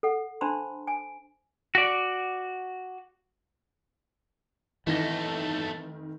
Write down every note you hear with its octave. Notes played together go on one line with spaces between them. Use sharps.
A4 F#5
D4 C5 A5 B5 C6
G#5
F#4 D5
F1 B1 D#3 E3 A3 A#6